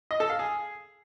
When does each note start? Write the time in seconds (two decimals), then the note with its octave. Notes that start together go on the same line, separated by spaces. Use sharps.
0.11 D#5
0.20 A4
0.30 F5
0.39 G#4